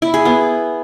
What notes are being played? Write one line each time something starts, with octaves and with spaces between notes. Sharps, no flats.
E4
G#4
B3